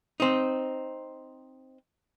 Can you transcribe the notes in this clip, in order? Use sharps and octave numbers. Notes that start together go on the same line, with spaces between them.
C4 D#4